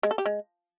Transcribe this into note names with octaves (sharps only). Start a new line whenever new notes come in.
G#3
A4
G4
G#3